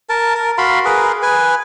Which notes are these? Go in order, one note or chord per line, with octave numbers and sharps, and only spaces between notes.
A#4 A5
A#4
F#4 F5 B5 C6
G#4 A#4 B4
B4 G#5